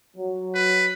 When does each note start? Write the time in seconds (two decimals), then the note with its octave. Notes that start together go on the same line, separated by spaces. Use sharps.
0.17 F#3
0.55 B4